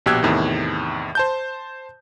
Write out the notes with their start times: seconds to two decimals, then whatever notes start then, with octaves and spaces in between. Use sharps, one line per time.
0.06 A#1 B2 G4 E6 F#6 G#6
0.23 E2 A2 C3 D#3
1.15 C5 A5 G6